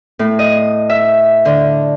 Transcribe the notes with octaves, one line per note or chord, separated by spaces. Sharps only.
A2
D#5
E5
D3